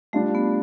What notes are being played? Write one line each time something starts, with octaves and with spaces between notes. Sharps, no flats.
G3 A3 D4 F4
B3